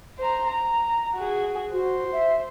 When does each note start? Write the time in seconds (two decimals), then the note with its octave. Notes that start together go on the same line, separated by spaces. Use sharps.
0.18 C5 A#5
0.47 A#5
1.15 F#4 G#4
1.73 F#4 C5
2.13 E5